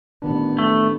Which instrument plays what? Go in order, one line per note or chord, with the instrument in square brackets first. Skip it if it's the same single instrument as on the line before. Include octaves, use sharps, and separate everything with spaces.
[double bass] A1 B3 [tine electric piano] D#3 D4
[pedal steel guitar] A3